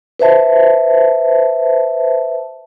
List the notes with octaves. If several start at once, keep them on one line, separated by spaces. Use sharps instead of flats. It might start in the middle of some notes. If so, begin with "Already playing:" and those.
B4 C5 E5 A5